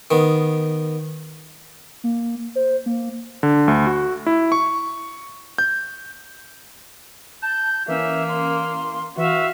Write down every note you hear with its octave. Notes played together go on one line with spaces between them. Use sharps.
D#3 B3
A#3
C5
A#3
D3
D2
F#4
E4
C#6
G6
A5 G6
E3 A#3 C#4 E5
C6
E3 F#4 E5 F5